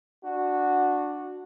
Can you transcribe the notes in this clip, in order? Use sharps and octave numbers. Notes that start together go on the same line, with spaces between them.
D4 F#4